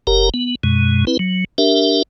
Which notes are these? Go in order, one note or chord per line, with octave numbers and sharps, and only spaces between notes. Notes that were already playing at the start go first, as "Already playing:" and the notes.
F#1 G4 A#4 A#5
B3
F#2 B2 G#3
C4 E4 B4
F#3
D4 G4 A#4 E5